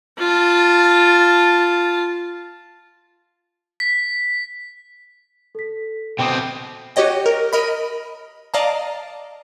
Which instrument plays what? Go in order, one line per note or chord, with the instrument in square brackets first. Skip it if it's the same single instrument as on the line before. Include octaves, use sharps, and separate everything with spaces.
[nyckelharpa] F4 A5
[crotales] B6
[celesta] A4 B6
[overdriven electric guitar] B2 C4 [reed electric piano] G5 D6 D#6
[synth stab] F#4 G4 C#5 D#5 G5
A#4
A#4 D#5 B5
D5 D#5 F5 A5 A#5